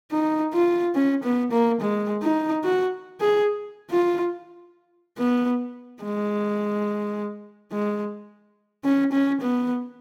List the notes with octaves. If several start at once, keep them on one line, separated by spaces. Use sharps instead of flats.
D#4
F4
C#4
B3
A#3
G#3
D#4
F#4
G#4
F4
B3
G#3
G#3
C#4
C#4
B3